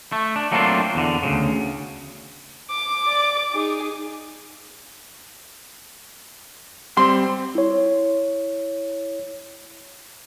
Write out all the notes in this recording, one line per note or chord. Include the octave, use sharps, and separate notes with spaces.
A3
D4
F#3 A3 A#3 C4 D4 F4
E2 D3
D2 A#2 C#3
D6
D5
D#4 G#4
G3 C4 C6
E4 C#5